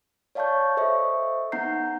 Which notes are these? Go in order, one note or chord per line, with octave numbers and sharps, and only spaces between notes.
C#5 D5 F5 A5 C#6 G6
A4 C5 D#5 E5 C#6
B3 D#4 F#5 A#5 G6 C7